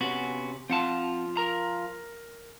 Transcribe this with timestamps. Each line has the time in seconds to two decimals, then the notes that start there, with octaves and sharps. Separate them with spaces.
0.01 C3 B3 C#4 F#4
0.70 F3 C4 F4 F#5 A5
1.37 A#4 A#5